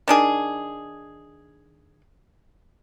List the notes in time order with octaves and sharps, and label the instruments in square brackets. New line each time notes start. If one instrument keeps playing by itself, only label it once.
[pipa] D#3 D4 G#4